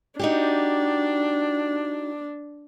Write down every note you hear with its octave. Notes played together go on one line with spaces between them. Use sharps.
D4 D#4 F#4 G4